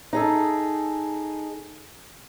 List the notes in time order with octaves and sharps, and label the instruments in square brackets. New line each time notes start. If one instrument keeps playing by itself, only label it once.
[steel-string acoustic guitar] D#4 G#4 A4